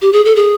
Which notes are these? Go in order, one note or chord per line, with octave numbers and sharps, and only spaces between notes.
G4
G#4
A4
G#4